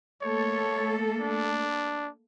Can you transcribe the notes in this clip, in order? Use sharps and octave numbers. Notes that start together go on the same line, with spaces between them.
A3 A#3 A4 C#5
D4